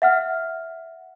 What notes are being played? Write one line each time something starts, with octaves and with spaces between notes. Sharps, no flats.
E5 F#5 F6